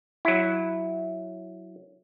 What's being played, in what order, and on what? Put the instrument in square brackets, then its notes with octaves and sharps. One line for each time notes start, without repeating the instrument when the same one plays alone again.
[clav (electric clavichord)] F#3 E4